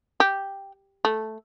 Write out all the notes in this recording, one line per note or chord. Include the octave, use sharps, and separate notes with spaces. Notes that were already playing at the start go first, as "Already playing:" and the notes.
G4
A3